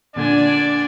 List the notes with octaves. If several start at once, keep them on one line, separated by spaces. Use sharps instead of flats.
A#2 D3 D4 D5 G#5 G#6